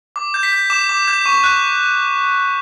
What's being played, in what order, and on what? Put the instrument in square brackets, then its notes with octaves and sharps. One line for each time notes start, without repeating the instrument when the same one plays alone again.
[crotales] D6
G6
B6
G6
D6 E7
D6
G6
C#6
F#6